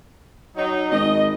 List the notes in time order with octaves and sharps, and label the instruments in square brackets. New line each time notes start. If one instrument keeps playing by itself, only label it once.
[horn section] F#3 D#4
[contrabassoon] G#1 [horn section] D#5